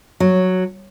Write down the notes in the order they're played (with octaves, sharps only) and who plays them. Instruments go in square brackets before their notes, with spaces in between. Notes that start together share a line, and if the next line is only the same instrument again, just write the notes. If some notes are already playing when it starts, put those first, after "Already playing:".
[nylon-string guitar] F#3